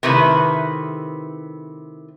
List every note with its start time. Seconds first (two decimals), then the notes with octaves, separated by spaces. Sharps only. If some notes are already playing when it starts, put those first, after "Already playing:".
0.03 C3 D#3 A3 E4 B4